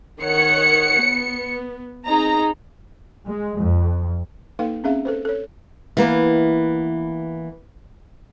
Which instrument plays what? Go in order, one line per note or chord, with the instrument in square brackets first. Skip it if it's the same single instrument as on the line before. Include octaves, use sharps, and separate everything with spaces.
[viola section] D#3 C#5 F#5 [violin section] C#7
[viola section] B3
[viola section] C4 D#4 G#4 [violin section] A#5
[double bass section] G#3
F2
[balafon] A#3 D#4 A4 B4 F5
C4 C#4 G#4 E5 F5
A4 B4 C5
A4 C#5
[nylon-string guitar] E3 A#3 B3